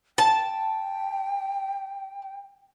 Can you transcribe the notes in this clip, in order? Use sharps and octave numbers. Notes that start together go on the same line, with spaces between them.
G5 A5